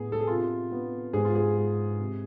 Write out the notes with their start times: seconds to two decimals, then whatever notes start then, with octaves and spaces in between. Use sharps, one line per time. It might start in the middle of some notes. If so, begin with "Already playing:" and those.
Already playing: A2 B3 G#4
0.12 A4
0.20 G#4
0.27 C3 F4
0.71 B3
1.13 G#2 G#4
1.25 F4
1.35 G#4
1.57 G#3
1.99 C3